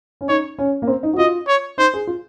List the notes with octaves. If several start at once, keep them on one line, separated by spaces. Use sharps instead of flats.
C#4
D#4 C#5
C#4
A#3
C4
D#4
F#4
F4 D#5
C#5
D#4 C5
G#4
F4